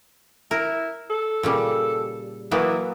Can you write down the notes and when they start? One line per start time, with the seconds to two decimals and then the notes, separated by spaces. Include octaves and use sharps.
0.51 E4 A#4
1.10 A4
1.43 A#2 C#3 G3
2.51 E3 F#3 A#3 B3